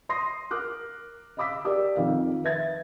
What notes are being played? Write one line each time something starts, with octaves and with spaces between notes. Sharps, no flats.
C6 D#6 A#6 C7
A#4 D6 F6 F#6
D#5 F5 B5 D6 E6 B6
G4 A#4 D5 D6 E6
F2 D#3 F5
B4 E5 G#6 A6